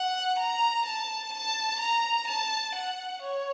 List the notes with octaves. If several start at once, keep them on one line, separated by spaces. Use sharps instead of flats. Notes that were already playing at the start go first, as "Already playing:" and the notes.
Already playing: F#5
A#5
A5
A5
A#5
A5
F#5
C#5